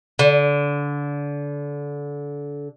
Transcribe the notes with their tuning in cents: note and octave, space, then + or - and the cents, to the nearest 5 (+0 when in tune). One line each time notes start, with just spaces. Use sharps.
D3 -25